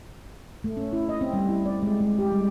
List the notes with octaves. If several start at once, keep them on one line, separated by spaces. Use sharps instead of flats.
A3
C#4
E4
D#5
C4
G3
E4
D5
G#3
G#3
G4
G3